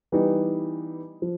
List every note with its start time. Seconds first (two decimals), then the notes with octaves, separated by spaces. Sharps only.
0.12 E3 G3 B3 D#4 G4
1.22 F3